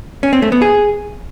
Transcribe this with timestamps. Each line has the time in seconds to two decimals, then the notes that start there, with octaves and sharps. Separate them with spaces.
0.23 C#4
0.33 C4
0.42 A3
0.52 B3
0.62 G#4